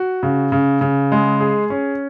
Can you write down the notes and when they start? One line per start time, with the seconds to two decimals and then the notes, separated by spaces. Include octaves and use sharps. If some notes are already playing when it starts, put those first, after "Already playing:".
Already playing: F#4
0.23 C#3
0.52 C#3
0.81 C#3
1.12 G#3
1.41 G#4
1.70 C#4